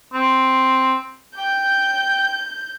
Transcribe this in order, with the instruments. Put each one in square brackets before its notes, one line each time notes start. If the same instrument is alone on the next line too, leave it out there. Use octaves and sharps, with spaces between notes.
[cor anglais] C4
[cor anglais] G5 [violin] G6